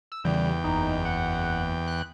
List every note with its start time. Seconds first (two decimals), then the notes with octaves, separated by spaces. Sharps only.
0.12 E6
0.25 E2 C#3 E3 G3 G5
0.64 F#1 D#4
1.05 F#5
1.87 F#6